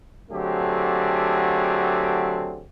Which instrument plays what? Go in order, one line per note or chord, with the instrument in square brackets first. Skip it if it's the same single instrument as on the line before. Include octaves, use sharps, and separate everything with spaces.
[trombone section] D3 F#3 A3 C4 G4 G#4